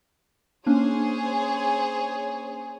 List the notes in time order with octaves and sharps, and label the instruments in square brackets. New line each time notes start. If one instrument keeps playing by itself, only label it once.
[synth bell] A#3 C#4 D4 [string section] G#4 C5 C#5